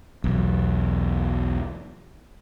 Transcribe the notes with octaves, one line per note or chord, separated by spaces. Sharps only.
B1 E2